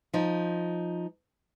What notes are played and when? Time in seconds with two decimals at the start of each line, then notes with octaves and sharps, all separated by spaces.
0.14 F3 D#4